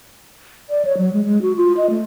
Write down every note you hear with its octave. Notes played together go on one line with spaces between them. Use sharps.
D5
C#5
F#3
G#3
G#3
F#4
F4
D#5
A3